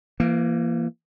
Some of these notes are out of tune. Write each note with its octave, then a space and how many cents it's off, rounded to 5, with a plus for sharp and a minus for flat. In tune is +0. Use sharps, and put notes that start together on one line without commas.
E3 +40 A#3 +0